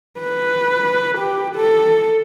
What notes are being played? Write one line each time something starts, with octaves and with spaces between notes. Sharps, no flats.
B4
G4
A4